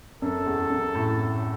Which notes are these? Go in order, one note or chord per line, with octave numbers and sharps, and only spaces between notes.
F#2 A4
E2
F#2
A2